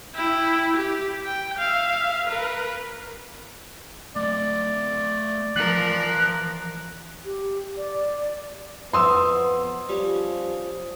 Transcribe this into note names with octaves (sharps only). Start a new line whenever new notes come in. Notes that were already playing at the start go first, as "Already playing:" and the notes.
E4 G5
G4
G5
E5 F5
A#4 B4
A3 D5 D#5
E3 F3 A#4 F#6
G4
D5
F2 B3 C6 D#6 E6
F3 G3 C#4